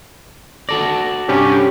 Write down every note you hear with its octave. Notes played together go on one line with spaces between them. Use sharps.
F#4 A4 D5 A#6
G2 C3 C#4 D4 G4